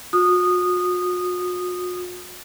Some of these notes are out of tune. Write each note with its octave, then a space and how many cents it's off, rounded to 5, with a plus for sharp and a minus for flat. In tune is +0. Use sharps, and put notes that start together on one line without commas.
F#4 -45 D#6 -15